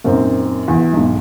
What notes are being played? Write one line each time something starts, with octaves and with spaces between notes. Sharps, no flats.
F#2 A#2 C4 D#4
E2
B1 G#2